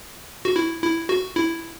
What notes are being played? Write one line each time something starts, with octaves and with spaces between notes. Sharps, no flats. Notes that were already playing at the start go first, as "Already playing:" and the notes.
F#4
E4
E4
F#4
E4